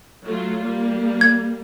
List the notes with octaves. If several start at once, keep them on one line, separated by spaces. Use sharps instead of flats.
F#3 A3 F4
G3 A#3
G#6